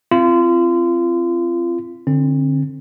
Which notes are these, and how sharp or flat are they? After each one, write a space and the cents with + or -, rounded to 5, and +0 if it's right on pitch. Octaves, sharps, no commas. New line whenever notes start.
C4 +0 F4 -30
D3 +10 C4 +35